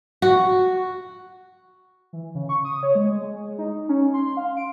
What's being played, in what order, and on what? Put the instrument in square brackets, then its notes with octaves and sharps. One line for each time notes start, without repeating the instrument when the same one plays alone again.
[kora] F#4
[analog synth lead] E3
C#3
C#6
D#6
C#5
G#3
G#3
D#4
C#4
C6
F5
D7